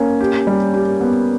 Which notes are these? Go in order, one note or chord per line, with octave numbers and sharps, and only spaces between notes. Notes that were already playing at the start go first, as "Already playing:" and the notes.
Already playing: A#3 C#4
G4
G3
G4
B3